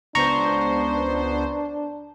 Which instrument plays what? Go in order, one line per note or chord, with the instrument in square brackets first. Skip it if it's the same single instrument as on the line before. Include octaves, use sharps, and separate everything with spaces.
[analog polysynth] C#2 B3 C5 [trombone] D4 [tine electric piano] A#5 C#6